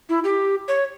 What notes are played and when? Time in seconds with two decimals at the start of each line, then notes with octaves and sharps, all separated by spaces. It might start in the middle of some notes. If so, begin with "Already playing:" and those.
0.09 E4
0.24 G4
0.68 C#5